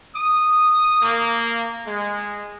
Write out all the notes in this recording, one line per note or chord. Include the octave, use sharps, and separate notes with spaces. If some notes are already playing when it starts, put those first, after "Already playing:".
D#6
A#3
G#3